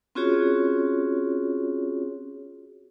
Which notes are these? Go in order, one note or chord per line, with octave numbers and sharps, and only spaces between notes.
C4 C#4 F4 F#4 G#4 C#5